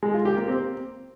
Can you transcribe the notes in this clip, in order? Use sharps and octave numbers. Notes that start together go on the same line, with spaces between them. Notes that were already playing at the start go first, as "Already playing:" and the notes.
G#3
F4
G4
A#3
C4